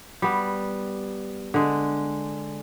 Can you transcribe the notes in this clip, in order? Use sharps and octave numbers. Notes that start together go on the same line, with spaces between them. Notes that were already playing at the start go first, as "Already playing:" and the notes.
G3 B3
D3 G#3